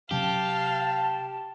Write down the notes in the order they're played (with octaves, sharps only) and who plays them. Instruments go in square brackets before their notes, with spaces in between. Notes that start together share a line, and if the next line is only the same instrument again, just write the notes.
[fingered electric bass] C3 F#3 C#4 [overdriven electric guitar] G4 [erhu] F5 [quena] A5